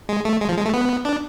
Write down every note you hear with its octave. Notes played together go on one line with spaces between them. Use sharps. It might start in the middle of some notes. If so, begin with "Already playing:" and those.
G#3
A3
G#3
F3
G#3
A3
B3
D4